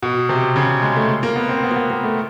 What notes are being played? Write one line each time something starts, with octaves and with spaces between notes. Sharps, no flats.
B2
C3
C#3
G#3
A3
A#3
B3
C4
B3
A#3
B3
A#3
A3